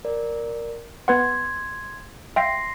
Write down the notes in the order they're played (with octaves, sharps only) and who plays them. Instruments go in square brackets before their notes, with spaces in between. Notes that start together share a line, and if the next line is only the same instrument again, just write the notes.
[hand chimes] A#4 D5
[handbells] B3 B4 F#5 [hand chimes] C6 G#6
[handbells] E5 F5 G5 [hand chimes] C6 A#6 C7